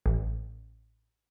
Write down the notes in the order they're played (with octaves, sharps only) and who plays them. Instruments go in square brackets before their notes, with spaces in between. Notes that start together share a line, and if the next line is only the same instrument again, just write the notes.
[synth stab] A1